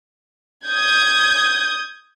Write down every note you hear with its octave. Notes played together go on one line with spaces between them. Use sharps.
D#6 G6 G#6